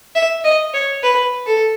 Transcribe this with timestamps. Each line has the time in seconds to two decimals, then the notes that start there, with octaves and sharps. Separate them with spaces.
0.15 E5
0.44 D#5
0.74 C#5
1.03 B4
1.46 A4